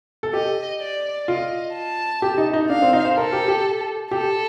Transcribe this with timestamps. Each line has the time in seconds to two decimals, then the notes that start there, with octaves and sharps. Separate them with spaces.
0.23 A4
0.33 G4 D#5
0.81 D5
1.28 F4 D#5
1.75 A5
2.22 G4
2.38 D#4
2.53 D#4
2.70 D4 F5
2.82 C4
2.93 D#4
3.05 C5
3.17 A4 A#4
3.33 G4
3.48 G4
4.11 G4 A4